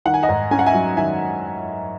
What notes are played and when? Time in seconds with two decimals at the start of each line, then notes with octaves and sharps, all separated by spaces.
0.05 D#3 F#5
0.14 G#5
0.23 D#5 F#5
0.29 G#2
0.51 C#4 G#5
0.59 F#5
0.66 E5 G#5
0.74 F#3
0.97 D#3 E5 G#5